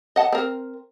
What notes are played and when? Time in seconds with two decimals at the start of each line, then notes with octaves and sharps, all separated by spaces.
0.16 D#5 F#5 A5
0.32 C4 A#4